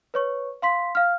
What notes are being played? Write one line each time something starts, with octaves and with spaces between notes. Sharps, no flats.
B4 C#5 C#6
F5 C6 B6
F5 F6